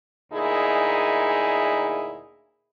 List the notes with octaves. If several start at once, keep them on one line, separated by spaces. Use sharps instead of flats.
D2 A#2 D#4 E4 G#4